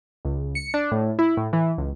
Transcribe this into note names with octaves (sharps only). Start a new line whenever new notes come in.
C#2
C#7
D4
A2
E4
A2
E3
C#2